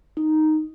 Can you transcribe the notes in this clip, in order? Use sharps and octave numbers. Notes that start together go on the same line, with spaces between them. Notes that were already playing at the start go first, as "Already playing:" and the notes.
D#4